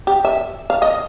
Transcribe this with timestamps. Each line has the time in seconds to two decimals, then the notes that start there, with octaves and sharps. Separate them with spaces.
0.07 G4
0.25 E5
0.70 F5
0.82 D#5